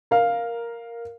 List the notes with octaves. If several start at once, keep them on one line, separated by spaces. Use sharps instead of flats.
A#4 F5